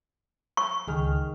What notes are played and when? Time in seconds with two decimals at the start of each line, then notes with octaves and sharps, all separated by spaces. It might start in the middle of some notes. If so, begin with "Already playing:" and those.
0.57 C#6
0.88 C#2 D#3 G#4 F6